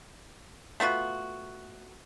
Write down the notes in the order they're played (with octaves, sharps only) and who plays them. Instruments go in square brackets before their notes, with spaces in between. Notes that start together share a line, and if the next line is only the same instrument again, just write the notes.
[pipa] A3 B3 F4 F#4